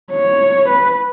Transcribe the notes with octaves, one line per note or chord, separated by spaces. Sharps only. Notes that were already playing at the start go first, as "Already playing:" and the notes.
C#5
B4